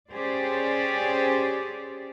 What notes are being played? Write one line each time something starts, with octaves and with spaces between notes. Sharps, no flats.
C#4 G4 G#4 C5 D5